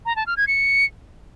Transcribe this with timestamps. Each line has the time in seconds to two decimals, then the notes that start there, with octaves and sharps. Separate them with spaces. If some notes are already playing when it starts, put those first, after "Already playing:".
0.06 A#5
0.16 A5
0.27 F6
0.37 G#6
0.48 C#7